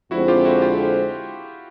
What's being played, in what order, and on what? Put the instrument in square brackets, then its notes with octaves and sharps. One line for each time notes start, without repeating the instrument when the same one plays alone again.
[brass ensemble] F2 D3 F3 G#3 C4 [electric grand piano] E4 F#4
[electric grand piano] F4 G4
E4 F#4
F4 G4